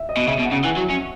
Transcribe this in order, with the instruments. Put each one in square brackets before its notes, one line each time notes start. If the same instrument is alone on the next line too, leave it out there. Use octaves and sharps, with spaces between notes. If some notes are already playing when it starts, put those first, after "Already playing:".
Already playing: [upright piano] E5
D#5
[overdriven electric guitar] B2
[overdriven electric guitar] C#3 [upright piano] E5
[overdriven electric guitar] B2
[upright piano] F#5
[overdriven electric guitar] C#3
[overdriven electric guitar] E3 [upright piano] G#5
[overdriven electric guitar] F#3
C#4